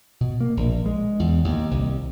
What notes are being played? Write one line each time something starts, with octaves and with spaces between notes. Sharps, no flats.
B2
A#3
A#1
G#3
E2
D#2
C2